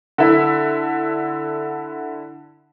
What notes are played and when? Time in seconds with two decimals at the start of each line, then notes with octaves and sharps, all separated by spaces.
0.18 D3 E4